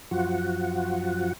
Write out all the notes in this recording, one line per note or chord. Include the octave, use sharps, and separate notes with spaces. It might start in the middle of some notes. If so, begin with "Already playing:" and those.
F#2 F3 F4 F#4 F#5